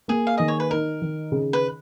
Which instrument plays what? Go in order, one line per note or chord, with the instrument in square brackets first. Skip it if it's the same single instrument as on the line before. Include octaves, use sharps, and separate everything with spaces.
[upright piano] A#3 [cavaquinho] G#4
[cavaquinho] F5
[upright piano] D#3 [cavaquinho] D#5
[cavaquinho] C#5
B4
[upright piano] D#4 [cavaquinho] A#4
[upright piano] D#3
C#3
[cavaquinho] B4